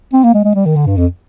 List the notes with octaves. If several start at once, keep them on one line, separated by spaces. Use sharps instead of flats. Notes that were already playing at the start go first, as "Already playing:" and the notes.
C4
A#3
G#3
G#3
G3
D#3
D3
G2
F2